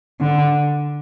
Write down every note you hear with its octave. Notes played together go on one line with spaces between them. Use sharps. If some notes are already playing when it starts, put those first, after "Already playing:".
D3